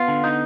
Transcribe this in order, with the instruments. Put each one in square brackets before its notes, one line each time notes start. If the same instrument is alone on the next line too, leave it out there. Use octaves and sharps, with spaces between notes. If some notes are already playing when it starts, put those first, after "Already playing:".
Already playing: [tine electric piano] B3 [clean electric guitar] F4
[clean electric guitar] D3
D#4